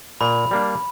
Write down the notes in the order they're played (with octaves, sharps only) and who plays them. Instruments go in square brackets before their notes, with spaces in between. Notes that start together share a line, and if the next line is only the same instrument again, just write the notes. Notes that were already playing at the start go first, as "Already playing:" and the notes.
[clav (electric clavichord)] A#2 [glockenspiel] B5
[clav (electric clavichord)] G3 A#3 D4